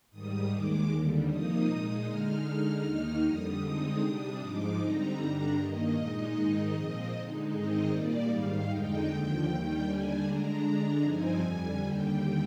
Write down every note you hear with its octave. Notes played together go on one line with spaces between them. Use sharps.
G#2 D#3 G3 D#6
D#2 D#3 G#3 D6
D#2 D3 G3
C3 F3 A#3 D#4 D#6
A#2 G#3 D#4
D3 G#3 D#4 F6
D3 G#3 D#4 F6
D#2 D#3 A#3 D#4
F2 D3 G3 D#6
D3 G#3 C4 D#4
C3 G3 D4
G#2 F3 G#3 D#4 D6
D3 G3 C4 D#4 A#5
G2 D3 G3 D4
G2 D#3 A#3 D#5
A#2 G#3 D#4
G#2 D#3 G#3 D#4
A#2 F3 C4
D3 G#3 D#4
G#2 D#3 G#3 C4 D#4 D#5
A#2 G3 A#3 D5
G#2 D#3 G3 F5
F2 D3 G#3 D#4 G5
D#2 D3 F3
D#2 D#3 G3
D#2 D3 G3 D4 G#5
D3 G#3 D4 A#5
D3 G#3 D4
G2 F3 C4 D#4 G#5
F2 D3 G3
D#2 D3 G3 G5